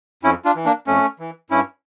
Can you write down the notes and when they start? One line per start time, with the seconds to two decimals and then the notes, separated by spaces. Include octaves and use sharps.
0.23 F2 C#4 E4
0.45 D4 F4
0.56 E3
0.65 A#3 D4
0.87 F2 A3 C#4
1.19 E3
1.50 G2 C#4 E4